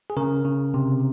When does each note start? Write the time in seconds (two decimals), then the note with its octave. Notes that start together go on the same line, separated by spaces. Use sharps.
0.10 G#4
0.17 C#3 A#4
0.45 C#3
0.74 C3